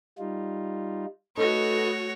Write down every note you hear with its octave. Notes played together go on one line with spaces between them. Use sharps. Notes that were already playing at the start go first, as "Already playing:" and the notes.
G3 D#4 F4
A3 D#4 F#4 A4 B4 C#5 D#5